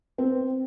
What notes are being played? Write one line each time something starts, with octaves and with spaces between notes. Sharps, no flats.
C4